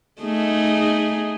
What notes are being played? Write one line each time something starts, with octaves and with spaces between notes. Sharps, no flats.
A3 D#4 G#4